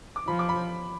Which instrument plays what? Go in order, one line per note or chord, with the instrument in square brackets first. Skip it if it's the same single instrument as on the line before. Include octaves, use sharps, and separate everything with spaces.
[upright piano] D6
[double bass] F3 [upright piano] B5
[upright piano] D6
B5